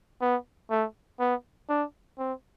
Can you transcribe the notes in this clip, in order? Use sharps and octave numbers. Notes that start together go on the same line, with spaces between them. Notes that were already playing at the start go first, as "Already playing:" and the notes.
B3
A3
B3
D4
C4